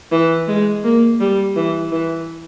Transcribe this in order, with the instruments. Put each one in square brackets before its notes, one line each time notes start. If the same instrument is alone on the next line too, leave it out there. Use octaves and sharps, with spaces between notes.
[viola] E3
G#3
A#3
G3
E3
E3